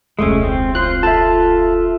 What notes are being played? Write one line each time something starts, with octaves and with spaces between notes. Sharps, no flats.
E1 C#2 G#3 A3 C#4
C4
F4 C5 C6 F#6
F4 A4 E5 A5